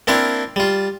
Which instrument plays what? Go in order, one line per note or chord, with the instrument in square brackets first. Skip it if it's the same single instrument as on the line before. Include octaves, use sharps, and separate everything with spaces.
[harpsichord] A#3 C4 D4 E4 C5 F5
G3 F4